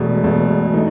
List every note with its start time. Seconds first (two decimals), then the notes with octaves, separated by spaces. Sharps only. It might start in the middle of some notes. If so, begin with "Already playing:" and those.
Already playing: E1 E2 B2 A3
0.24 E1 E2 B2 A3
0.74 E3 A3 D#4